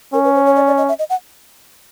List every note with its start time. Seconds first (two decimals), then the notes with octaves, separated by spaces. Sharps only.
0.14 C#4 A#4
0.24 B4
0.35 C5
0.46 C#5
0.56 D5
0.67 D5
0.78 D#5
0.89 E5
0.99 D#5
1.10 F#5